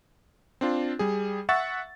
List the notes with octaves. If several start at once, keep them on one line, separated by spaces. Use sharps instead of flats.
C4 D4 F4
G3 G#4
E5 F#5 C#6 E6 A6